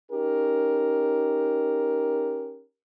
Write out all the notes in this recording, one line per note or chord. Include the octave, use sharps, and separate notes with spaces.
C#4 D#4 G4 A#4